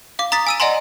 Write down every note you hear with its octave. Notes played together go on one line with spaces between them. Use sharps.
F5 D6
A#5 D#6 A6 B6
G#5 E6 D#7
D5 D#5 F#5 G#5 A#5 C6